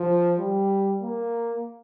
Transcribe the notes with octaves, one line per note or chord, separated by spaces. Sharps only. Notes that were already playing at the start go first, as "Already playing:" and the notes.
Already playing: F3
G3
A#3